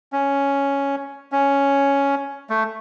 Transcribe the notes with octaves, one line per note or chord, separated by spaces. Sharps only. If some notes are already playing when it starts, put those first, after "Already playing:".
C#4
C#4
A3